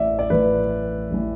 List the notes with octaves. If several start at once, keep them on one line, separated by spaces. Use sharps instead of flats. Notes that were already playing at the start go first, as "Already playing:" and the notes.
Already playing: A1 A2 E3 D5 E5
D5
A1 A2 E3 B4
A1 A2 E3